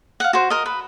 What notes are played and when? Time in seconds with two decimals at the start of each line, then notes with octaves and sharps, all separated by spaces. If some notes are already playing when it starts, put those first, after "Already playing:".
0.20 F5 F#5
0.33 F#4 C5
0.50 A#4 D#5
0.66 B4